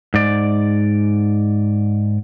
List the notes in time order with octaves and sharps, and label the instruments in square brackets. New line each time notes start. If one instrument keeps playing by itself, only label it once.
[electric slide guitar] G#2 D5